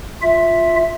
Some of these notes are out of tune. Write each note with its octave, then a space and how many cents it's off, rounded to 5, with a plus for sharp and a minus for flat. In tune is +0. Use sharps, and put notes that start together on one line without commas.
F4 +5 E5 +0